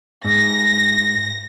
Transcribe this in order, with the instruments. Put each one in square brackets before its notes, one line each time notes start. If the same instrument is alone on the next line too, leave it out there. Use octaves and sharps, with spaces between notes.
[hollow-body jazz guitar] G#2 [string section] A#6